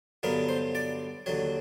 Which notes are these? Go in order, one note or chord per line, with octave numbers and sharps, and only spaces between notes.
G2 D3 F#3 B3 A#4
C5
D5
D#2 D3 F#3 C#5